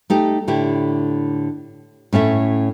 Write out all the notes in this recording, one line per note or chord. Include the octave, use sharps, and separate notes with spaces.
A3 D#4 G4
A2 D3 E4 G4
A2 C#4 A4 E5